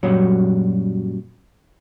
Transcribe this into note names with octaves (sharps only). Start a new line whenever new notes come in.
F#2 A#2 F#3 G3 F#4 C#5